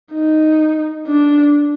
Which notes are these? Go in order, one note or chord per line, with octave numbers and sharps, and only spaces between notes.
D#4
D4